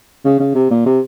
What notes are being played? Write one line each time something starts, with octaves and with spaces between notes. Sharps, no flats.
C#3
C#3
C3
A#2
C3